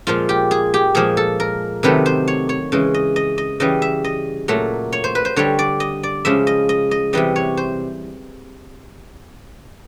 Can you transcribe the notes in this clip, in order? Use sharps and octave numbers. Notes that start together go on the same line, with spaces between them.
A#2 F3 G#3 F4
G4
G#4
G4
A#2 F3 G#3 G#4
A4
A#4
C3 D#3 F#3 A3 B4
C5
C#5
C#5
C#3 E3 G#3
D#5
D#5
D#5
C#3 E3 G3 D#5
E5
D#5
A#2 F#3 A3
C#5
C5
B4
C5
D3 G3 C#5
D5
D#5
D5
C#3 F3 G#3 E5
D#5
D#5
D#5
C3 E3 G3 D#5
C#5
C5